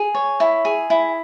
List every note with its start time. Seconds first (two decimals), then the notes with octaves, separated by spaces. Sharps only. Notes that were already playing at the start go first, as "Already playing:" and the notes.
Already playing: G#4
0.15 C#5
0.40 E4
0.65 G#4
0.90 E4